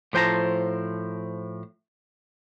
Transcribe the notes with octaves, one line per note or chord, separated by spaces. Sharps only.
A2 F3 C5 G5 A5 A#5